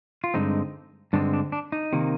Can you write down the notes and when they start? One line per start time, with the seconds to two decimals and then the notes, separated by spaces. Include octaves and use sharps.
0.24 F4
0.34 G2 D3 G#3 C4 D#4
1.13 G2 D3 G#3 C4 D4
1.33 D4
1.52 D4
1.72 D#4
1.93 C3 D#3 A#3